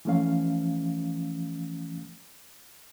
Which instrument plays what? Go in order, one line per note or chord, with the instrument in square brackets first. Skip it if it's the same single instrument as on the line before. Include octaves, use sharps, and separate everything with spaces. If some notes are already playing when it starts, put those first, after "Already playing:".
[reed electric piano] E3 F3 A3 C#4 F5